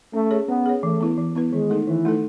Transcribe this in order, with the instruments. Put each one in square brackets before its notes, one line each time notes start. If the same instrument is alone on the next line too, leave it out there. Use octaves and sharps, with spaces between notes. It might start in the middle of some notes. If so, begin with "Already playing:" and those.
[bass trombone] A3 [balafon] C#4
[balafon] G#4 C#5
[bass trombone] B3 [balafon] C#4
[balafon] G#4 C#5
[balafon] E3 [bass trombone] A3
[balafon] B3 E4 B4
E3
B3 E4 B4
[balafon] D#3 [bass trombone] G#3
[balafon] A3 D#4 A4
[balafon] D#3 [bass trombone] E3
[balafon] A3 D#4 A4